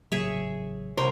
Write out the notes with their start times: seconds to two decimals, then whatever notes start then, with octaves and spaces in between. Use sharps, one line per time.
0.12 A1 C#3 F#3 G#4 C#5 E5
0.97 C2 A#4 C5 G5